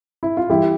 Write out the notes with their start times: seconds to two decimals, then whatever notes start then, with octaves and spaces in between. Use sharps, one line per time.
0.23 E4
0.37 F4
0.49 E3 G3 E4 G4